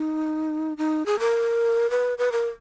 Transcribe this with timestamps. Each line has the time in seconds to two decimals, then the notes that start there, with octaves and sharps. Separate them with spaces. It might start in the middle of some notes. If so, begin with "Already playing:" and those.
Already playing: D#4
0.77 D#4
1.06 G#4
1.19 A#4
1.90 B4
2.18 B4
2.32 A#4